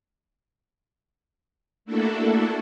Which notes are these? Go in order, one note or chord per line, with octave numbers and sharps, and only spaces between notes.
A3 A#3 D4 E4 F#4 A4